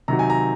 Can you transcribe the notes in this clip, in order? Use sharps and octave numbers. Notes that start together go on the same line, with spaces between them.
C3 D#3 F#3 A#5
G#5
A#5